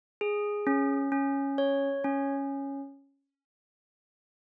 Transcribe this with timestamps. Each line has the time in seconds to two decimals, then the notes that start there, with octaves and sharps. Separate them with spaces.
0.21 G#4
0.67 C#4
1.12 C#4
1.58 C#5
2.04 C#4